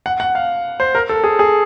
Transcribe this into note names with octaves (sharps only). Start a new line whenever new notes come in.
F#5
F#5
F5
C5
A#4
A4
G#4
G#4